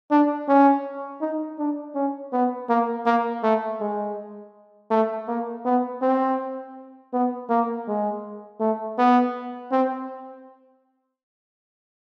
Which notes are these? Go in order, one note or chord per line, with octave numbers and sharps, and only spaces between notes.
D4
C#4
D#4
D4
C#4
B3
A#3
A#3
A3
G#3
A3
A#3
B3
C4
B3
A#3
G#3
A3
B3
C4